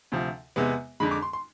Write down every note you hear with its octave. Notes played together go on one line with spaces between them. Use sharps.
D2 C3 F3
E2 C3 G#3 B3
F2 D3 G#3 B5
D6
C6
C6